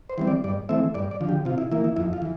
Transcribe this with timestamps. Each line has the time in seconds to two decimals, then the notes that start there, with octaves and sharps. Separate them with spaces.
0.10 C5
0.18 E3 G3 C4
0.27 D5
0.44 G2 D5
0.69 E3 A3 C4 E5
0.94 G2 D5
1.11 D5
1.21 D3 F3
1.29 G4
1.45 C3 F4
1.58 E4
1.71 E3 A#3 E4
1.84 E4
1.96 F2 E4
2.13 F4
2.22 E3